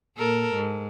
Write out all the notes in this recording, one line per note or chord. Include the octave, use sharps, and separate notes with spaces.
A#2 A4 A#4
G#2